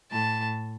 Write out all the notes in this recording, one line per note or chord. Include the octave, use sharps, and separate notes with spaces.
A2 A5